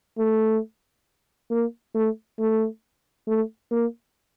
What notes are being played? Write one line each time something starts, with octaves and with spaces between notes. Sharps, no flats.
A3
A#3
A3
A3
A3
A#3